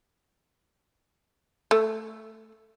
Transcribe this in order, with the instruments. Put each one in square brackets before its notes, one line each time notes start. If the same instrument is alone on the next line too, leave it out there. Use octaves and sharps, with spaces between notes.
[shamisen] A3